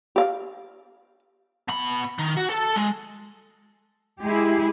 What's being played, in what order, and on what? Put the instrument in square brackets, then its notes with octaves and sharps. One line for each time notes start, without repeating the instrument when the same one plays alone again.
[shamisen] G4 F5
[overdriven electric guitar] B2 B5
D#3
F#4
A4 A5
G#3
[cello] G#3 G#4 [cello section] E4 G4